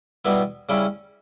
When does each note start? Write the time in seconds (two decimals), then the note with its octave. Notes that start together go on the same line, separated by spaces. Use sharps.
0.25 B2 G3 B3 E4
0.69 C#3 G3 C#4 E4